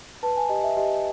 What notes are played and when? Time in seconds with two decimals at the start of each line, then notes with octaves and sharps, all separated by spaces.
0.23 B4 A5
0.37 G#5
0.49 G4 D#5
0.63 E5
0.76 G4 D#5